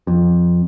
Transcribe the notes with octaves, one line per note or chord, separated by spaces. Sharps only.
F2